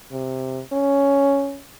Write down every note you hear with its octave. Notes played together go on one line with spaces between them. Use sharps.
C3
C#4